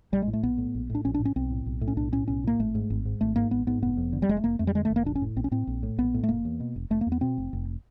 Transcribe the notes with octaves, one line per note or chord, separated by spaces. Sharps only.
A#1 G3
G#3
A2
A3
A#1 B3
A2
A#1
A2
D4
A#1 C#4
D4
A2
C#4
B1 C4
A2
B1
A2
C#4
B1 D4
A2 C#4
B1 C#4
A2 A#3
G#1 A3
G#2
G#1
G#2
G#1 A3
G#2 A#3
G#1 B3
G#2 B3
F1 B3
F2
D3
G3
F1 G#3
A3
F1 A#3
F2 A3
G3
D3 G#3
A3
F1
A#3
A#1 D4
C#4
A2
A#1 C4
C#4
A2 C4
A#1
A2
A#1 B3
A2
A3
F1 A#3
E2
B2
F1
F1 A3
A#3
E2
B3
B2 C4
F1
F1